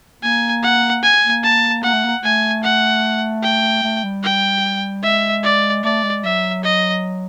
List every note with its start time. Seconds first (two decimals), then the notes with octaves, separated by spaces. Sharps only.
0.23 A#3 G#5
0.63 F#5
1.03 G#5
1.23 A#3
1.44 A5
1.83 A#3 F#5
1.92 A3
2.04 A#3
2.23 A3 G#5
2.63 F#5
3.43 G5
3.83 A3
4.04 G3
4.23 G5
5.03 G#3 E5
5.43 D5
5.83 A3 D5
6.03 G#3
6.24 F#3 E5
6.64 D#5